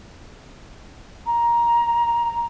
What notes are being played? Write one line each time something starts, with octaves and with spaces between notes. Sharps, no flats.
A#5